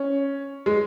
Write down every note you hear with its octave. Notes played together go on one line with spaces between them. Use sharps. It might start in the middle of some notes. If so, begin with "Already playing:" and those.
Already playing: C#4
G#3